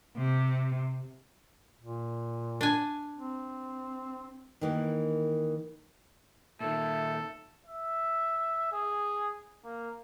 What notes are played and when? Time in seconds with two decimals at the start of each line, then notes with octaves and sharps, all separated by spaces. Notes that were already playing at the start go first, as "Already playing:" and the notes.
0.17 C3
1.80 A#2
2.61 D4 G#5
3.16 C4
4.61 D#3 E3 A#3
6.61 A#2 D#3 A4 E5
7.66 E5
8.72 G#4
9.64 A#3